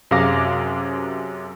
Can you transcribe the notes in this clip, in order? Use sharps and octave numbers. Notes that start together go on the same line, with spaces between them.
F#2 C3 G#4 F5 D6 A#6